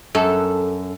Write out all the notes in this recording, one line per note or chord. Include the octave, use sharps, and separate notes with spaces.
F#2 A4